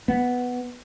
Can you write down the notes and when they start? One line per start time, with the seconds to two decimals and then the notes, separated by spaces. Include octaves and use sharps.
0.08 B3